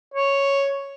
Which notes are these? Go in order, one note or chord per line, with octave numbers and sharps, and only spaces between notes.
C#5